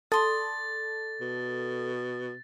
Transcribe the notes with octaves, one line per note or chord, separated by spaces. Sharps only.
A4 D5 C6 D#6 A6
B2